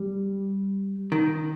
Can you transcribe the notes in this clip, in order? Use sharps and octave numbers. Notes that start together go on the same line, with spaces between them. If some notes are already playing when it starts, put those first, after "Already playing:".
Already playing: G3
D#3